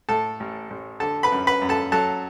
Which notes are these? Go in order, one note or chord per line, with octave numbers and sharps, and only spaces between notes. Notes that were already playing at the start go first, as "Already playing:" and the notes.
A2 A4 A5
A1
A1
D3 A4 A5
B4 B5
F#2
B4 B5
F#2
A4 A5
F#3 A4 A5